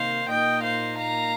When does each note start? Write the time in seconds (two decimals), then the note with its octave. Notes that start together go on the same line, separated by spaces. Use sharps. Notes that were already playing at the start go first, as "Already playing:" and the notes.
Already playing: C3 D#3 A#3 D#4 C5 F5
0.29 A#2 A#3 D#4 D#5 G5
0.63 C5 F5
0.98 F5 A#5